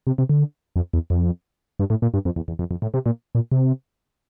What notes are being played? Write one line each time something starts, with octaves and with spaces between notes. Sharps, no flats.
C3
C3
D3
F2
E2
F2
G2
A2
A#2
G2
F2
E2
E2
F2
F2
A2
C3
A#2
A#2
C3